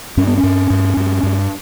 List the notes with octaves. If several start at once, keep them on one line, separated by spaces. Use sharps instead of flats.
G2 C#4
B3
C#4
G2
G2
G2
G2